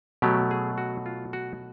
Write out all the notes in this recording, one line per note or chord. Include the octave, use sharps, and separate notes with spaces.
B2 F#3 A3 G4
G#4
F#4
F4
F#4